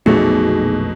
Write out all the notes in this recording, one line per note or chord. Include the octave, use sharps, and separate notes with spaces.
A#1 F2 B2 F#3 A3 D#4 G#4